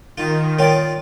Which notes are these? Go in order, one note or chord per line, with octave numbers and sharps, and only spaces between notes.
D#3 F4
F4 A#4 C#5 D5 G5